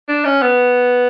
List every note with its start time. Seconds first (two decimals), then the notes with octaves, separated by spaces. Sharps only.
0.08 D4
0.25 C#4
0.42 B3